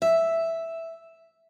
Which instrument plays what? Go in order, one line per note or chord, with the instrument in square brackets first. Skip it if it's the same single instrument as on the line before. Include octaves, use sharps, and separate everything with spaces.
[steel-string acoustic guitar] E5